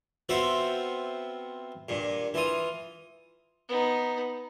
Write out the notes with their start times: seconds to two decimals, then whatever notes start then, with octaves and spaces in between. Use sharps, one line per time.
0.29 B3 C4 F4 F#4 C5 E5
1.89 G2 A#2
2.34 E3 F4 D#6
3.69 B3 D#4